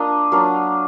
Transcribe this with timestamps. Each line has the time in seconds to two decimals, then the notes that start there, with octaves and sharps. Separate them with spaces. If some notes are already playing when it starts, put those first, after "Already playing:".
Already playing: A#3 D4 F4 D#5
0.32 F#3 A#3 D4 F4